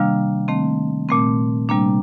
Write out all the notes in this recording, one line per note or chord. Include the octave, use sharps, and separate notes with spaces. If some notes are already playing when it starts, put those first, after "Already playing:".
Already playing: C3 D#3 G3 A#3 D4 F5 F6
D#3 A3 C4
A#2 A3 C4
C3 G3 A#3 D4